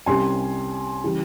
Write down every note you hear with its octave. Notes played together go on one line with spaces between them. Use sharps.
C2 C3 G3 C#4 G#5 C6
C#3 E3 G3